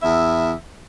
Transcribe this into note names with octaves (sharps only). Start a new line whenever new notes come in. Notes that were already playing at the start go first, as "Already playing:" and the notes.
E2 E4 E5